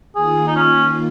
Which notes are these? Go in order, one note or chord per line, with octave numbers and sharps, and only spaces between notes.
D#3 A#3 F4 G#4
D#4
C#4